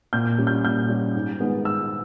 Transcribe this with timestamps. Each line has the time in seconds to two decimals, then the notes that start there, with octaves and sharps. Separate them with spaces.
0.13 A#2 G6
0.38 G3 C#4
0.47 G6
0.64 A#2 G6
0.89 G3 C#4
1.15 G#2
1.40 D#3 G#3 B3
1.65 G#2 E6